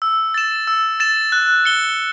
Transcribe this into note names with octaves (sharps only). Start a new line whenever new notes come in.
E6
A6 E7
E6
A6 E7
F#6
C#7 G7